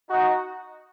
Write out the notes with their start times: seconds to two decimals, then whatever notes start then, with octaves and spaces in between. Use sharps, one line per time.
0.09 D#4 F#4